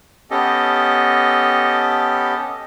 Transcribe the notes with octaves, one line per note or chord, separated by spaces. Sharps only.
B3 C#4 G4 A4 D#5